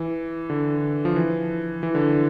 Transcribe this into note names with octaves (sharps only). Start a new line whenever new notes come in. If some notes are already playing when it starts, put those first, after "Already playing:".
Already playing: E3
D3
F3
E3
E3
D3